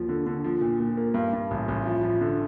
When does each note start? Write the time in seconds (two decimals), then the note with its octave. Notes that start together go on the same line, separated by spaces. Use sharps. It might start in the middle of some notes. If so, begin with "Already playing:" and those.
Already playing: D#2 F3
0.09 D3
0.26 D3
0.44 F3
0.61 A#2
0.80 A#2
0.97 A#3
1.14 G2
1.33 G2
1.51 A1
1.68 A1
1.86 F3
2.03 F3
2.21 D3